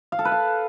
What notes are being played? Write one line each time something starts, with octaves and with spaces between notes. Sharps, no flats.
F5
A4
B4
F5